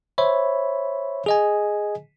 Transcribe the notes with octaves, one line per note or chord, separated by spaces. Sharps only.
C5 C#5 E5 B5
G#4 D#5 G#5